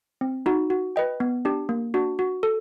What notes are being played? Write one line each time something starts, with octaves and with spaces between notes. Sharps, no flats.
C4
D#4 F#4
F#4
B4 D#5 G5
B3
D4 G4
A#3
D4 F#4
F#4
A4